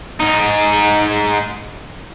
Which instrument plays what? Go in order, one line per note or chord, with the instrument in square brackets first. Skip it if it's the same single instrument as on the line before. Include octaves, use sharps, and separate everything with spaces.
[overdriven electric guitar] G#2 D#4